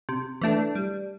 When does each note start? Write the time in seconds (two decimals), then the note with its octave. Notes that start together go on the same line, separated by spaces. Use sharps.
0.09 C3
0.42 E3 A3 D4
0.75 G3